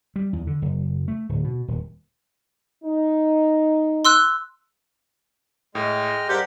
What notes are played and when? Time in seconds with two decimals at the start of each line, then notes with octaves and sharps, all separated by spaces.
0.16 G3
0.33 E2
0.47 D3
0.62 F#1
1.08 A3
1.29 D1
1.44 B2
1.68 D#1
2.84 D#4
4.05 C6 E6 F#6
5.75 A2 G#3 D#5 G5 F6
6.29 G2 G4 A#4 C5 D5 F#5 G6